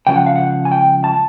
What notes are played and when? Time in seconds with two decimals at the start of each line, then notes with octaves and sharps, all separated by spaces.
0.07 C#2 C#3 F3 G5
0.16 F#5
0.26 F5
0.36 F#5
0.65 G#5
0.72 G5
1.04 A5